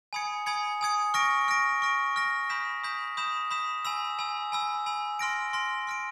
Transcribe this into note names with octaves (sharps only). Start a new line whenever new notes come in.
G#5 B5 D#6 G#6 C#7
G#5 B5 D#6 G#6 C#7
G#5 B5 D#6 G#6 C#7
C#6 F6 A#6 D7
C#6 F6 A#6 D7
C#6 F6 A#6 D7
C#6 F6 A#6 D7
B5 D#6 G6 B6 E7
B5 D#6 G6 B6 E7
B5 D#6 G6 B6 E7
B5 D#6 G6 B6 E7
G#5 B5 E6
G#5 B5 E6
G#5 B5 E6
G#5 B5 E6
C6 F6 A#6 D7
C6 F6 A#6 D7
C6 F6 A#6 D7